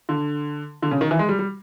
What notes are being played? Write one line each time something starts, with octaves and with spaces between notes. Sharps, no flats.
D3
D3
C#3
D#3
E3
G#3
G3
G3